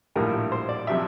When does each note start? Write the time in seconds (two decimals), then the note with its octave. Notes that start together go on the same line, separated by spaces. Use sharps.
0.16 A#1 A2 G3 A#4
0.52 C5
0.69 D5
0.87 C3 F3 E5